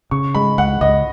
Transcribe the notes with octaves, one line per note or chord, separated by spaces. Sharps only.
C#3 C#6
G#3 B5
C#2 F#5
C#2 D#5